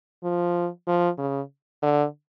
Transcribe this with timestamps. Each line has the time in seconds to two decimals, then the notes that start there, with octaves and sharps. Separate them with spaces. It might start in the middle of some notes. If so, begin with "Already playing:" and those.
0.24 F3
0.88 F3
1.18 C#3
1.83 D3